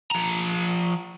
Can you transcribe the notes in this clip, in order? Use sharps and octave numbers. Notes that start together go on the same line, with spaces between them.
F3 A#5